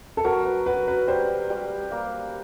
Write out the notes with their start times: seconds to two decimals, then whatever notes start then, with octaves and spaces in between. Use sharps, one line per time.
0.17 A4
0.24 F#3 A#4
0.45 B4
0.66 F#3 B4
0.88 B4
1.08 G3 C5
1.50 G3
1.92 A#3